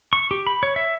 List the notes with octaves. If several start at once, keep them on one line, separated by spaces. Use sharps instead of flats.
C#6
G4
B5
C#5
E5